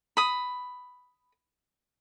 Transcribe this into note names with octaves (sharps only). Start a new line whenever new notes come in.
B5 D#6